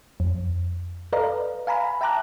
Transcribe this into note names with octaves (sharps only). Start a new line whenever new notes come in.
F2
A4 B4 D5 D#5 F5 A#5
F5 G#5 A#5 B5
E5 G5 A5 A#5 D6 F#6